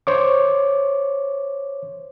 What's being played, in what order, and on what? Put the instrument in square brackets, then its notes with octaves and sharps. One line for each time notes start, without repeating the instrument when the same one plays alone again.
[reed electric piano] C5 C#5 D6